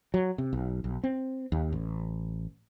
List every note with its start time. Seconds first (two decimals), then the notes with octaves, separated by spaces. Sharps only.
0.14 F#3
0.38 C3
0.53 B1
0.84 B1
1.04 C4
1.52 D#2
1.72 A1